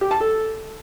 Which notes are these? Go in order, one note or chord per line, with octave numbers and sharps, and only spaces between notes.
G4
A5
A4